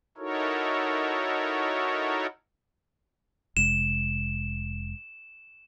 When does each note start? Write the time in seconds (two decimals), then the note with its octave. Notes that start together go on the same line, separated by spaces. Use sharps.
0.18 D#4 E4 F#4 A4 A#4 C#5
3.57 F1 C3 G#3 E7